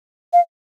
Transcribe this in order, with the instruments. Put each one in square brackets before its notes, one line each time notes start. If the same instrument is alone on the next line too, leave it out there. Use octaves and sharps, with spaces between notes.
[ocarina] F5